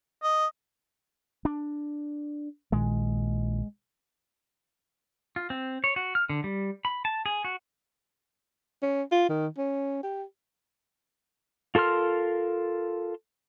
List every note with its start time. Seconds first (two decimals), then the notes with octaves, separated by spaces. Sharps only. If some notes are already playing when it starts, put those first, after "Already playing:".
0.23 D#5
1.45 D4
2.72 A#1 A#2 D#3 G#3
5.36 F4
5.50 C4
5.84 C#5
5.96 F#4
6.15 F6
6.29 D3
6.44 G3
6.85 B5
7.05 A5
7.26 G#4
7.45 F#4
8.83 C#4
9.12 F4
9.29 D#3
9.58 C#4
10.03 G4
11.75 F4 A4 A#4 C6 F6